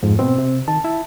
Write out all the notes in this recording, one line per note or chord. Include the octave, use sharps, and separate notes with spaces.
F2 G#2
B2 C4
C3
D#3 A5
E4